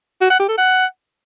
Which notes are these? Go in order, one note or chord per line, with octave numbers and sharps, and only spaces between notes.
F#4
F#5
G4
A4
F#5